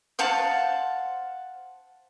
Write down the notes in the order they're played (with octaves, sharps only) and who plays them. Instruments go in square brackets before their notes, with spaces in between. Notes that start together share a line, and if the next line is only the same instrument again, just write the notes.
[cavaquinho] C5 F5 F#5 A5